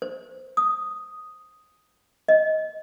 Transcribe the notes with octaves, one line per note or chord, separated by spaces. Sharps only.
C5
D#6
D#5